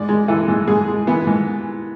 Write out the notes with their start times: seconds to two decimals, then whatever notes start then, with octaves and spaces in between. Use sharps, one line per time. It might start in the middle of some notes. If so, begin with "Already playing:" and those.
Already playing: G#2 D5
0.09 G#3
0.28 E3 A4
0.48 G#2
0.68 G#2 G#4
0.88 G#3
1.07 E3 B3
1.27 G#2